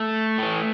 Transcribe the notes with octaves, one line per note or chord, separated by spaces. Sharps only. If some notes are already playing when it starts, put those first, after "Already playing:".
Already playing: A3
A2 E3